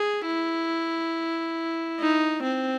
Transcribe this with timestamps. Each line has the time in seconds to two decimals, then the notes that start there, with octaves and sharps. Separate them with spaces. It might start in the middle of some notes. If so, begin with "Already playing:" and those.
Already playing: G#4
0.26 E4
2.00 D#4
2.43 C4